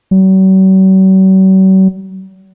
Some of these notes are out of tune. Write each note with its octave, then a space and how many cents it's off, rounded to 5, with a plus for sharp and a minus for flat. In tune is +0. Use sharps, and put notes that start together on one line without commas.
F#3 +45